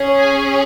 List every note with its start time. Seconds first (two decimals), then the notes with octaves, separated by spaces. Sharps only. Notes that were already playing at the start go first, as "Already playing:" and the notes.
Already playing: C#4 G#4
0.20 G#5